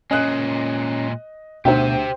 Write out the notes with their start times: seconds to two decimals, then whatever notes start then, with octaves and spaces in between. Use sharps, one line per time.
0.11 A#2 G#3 C#4 D#5 F#6
1.65 D2 B2 G4 C5 E5 G5